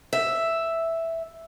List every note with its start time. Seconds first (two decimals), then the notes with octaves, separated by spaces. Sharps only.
0.13 E5